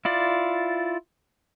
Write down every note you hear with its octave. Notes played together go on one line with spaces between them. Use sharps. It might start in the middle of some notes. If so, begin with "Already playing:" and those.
E4 F4 D5